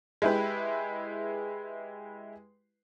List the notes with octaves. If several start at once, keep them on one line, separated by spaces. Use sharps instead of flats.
G#3 E4 G4 B4